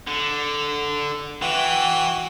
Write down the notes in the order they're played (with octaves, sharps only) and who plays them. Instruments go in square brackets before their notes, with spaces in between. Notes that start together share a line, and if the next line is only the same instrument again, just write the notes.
[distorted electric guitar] D3
[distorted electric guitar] E3 [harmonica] F#4 G5